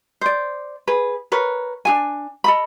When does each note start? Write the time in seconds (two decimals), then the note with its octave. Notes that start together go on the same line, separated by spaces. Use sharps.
0.21 C5 D5
0.87 G#4 B4
1.32 A#4 B4 C#5
1.85 D4 G#4 G#5
2.44 A4 D#5 B5